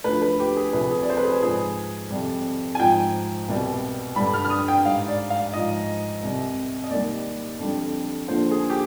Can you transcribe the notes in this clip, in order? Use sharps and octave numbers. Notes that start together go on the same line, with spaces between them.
D2 D3 F3 B4
B4
G4
G#4
C2 C3 F3 B4
G#4
D5
C5
B4
G#4
G#2 F3 G#4
F2 C3 G3
G#5
G#2 F3 G5
C2 B2 G3
G2 D3 G3 B5
F6
F6
D#6
G5
G#2 G3 F5
D5
F5
G#2 F3 D#5
C2 C3 G3
D#5
D#2 D#3 G3 D5
F2 D3 G3
D#2 D3 F3 C5
G#4
G4